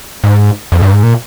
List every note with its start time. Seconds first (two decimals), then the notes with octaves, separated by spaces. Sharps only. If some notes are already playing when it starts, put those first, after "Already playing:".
0.24 G#2
0.72 F2
0.82 G2
0.93 G#2
1.03 A#2